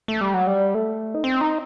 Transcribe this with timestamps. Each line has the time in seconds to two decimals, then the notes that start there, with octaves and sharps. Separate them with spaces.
0.08 A3
0.21 G3
0.34 F#3
0.47 G3
0.74 A3
1.14 D#4
1.24 C4
1.41 D#4